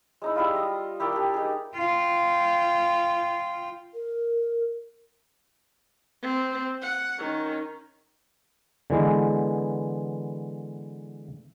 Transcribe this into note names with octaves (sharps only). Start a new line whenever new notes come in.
G#3 D#4 E4
G3 E4 F4
D#5
E4 G4 A#4 D5
D4 G4
D#4 G#4
F4 G5
A#4
C4
F#5
D#3 C#4
D3 E3 G#3 B3